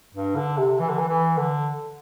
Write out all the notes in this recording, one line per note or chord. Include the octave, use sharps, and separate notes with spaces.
G2
D3
C3
E3
D3
E3
E3
D3